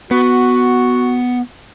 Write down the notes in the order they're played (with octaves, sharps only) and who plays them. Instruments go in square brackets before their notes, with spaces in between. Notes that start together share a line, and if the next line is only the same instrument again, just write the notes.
[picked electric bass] B3 [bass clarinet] F#4